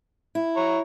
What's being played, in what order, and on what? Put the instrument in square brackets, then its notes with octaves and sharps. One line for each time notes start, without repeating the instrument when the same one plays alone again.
[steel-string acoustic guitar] E4
[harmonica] C#5 A#5